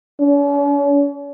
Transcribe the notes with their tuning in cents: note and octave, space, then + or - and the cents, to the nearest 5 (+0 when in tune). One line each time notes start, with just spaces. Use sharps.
C#4 +45